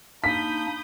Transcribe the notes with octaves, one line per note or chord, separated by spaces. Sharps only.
A#3 D4 D#4 B5 D#6 G6 B6